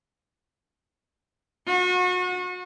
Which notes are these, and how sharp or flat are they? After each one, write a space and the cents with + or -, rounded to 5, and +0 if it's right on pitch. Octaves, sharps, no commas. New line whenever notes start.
F#4 -35